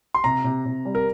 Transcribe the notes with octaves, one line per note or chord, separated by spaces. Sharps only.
C6
C3 A#5
C3
C3
G3
A#4